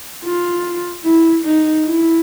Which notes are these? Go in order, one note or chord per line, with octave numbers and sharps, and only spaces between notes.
F4
E4
D#4
E4